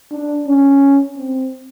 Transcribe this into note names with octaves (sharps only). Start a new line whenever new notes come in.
D4
C#4
C4